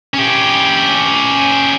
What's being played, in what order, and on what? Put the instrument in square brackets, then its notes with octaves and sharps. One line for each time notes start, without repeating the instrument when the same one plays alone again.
[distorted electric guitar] C#4 G4